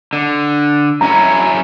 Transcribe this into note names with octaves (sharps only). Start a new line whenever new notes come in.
D3
F#2 C#4 E4 A#5